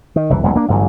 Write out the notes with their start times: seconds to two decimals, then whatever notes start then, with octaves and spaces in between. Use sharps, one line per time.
0.16 D#3
0.30 F#1 C2 E3
0.43 D#1 B1 A#2 G#3
0.56 A#3 D4
0.68 A1 G2 D3 F#3